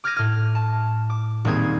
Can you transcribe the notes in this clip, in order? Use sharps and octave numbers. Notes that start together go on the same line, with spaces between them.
D6 F6 G6 G#6 A#6 D#7
A2 F6
A5
D6
D#1 A#3 C4 G#4 G6 G#6